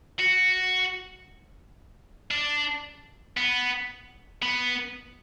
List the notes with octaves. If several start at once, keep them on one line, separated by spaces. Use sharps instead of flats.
F#4
D4
B3
B3